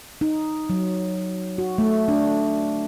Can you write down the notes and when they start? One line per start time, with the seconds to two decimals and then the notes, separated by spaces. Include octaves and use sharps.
0.21 D#4
0.70 F#3
1.58 F#4
1.78 A3
2.08 D4